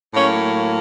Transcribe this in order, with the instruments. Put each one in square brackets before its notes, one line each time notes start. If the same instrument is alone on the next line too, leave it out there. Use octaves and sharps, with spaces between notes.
[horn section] A2 F#3 A#3 C#4